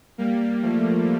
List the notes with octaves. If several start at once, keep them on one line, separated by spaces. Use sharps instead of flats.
G3 A#3
F3 A3